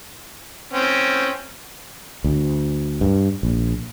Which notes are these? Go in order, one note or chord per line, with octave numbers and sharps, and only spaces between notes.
C4 C#4
D2
G2
A#1